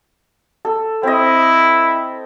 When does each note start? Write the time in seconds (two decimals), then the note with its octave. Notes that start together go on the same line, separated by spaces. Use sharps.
0.65 A4
1.03 C4 E4 D#5